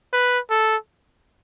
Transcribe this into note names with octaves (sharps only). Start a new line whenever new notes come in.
B4
A4